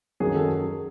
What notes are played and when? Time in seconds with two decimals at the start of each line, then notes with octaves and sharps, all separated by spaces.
0.20 F#2 D#3 F#3 G#4
0.35 A4